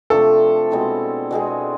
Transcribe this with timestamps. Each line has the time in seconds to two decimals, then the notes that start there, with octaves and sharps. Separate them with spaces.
0.10 C3 F3 A3 D4 A4
0.71 B2 G#3 C4 E4
1.31 B2 G#3 C4 G#4